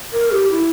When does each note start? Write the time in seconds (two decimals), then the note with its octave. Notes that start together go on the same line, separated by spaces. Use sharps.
0.13 A#4
0.31 G4
0.51 E4